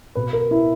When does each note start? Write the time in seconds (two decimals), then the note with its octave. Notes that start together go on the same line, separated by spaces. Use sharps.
0.15 B2 B4
0.33 A#4
0.51 E4